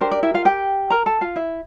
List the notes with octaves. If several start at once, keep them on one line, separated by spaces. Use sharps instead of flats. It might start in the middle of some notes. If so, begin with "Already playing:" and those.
D4 G4 A#4 C5
D5
E4 E5
F4 F5
G4 G5
A#4 A#5
A4 A5
F4 F5
E4 E5